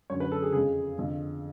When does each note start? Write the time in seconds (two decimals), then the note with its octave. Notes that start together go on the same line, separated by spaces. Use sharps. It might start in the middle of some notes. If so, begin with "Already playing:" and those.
0.10 F#2 D3 C#5
0.20 B4
0.32 A4
0.42 G#4
0.52 F2 C#3 G#4
0.96 F2 D3